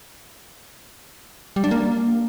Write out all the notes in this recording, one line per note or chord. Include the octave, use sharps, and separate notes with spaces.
G3
D4
A#3